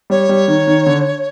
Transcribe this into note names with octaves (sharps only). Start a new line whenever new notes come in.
G3 C#5
G3
D#3
D#3
D3